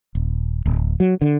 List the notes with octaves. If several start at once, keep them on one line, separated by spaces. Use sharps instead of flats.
D#1
D1
F#3
D3